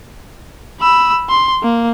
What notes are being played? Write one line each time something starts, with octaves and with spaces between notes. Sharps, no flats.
B5 E6
C6
A#3